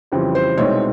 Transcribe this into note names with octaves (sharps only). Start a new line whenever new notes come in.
F2 C#3 E3 G3 C4
C5
C2 B2 G#3 C4 D#4 C#5